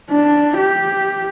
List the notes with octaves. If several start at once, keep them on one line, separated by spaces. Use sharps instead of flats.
D4
G4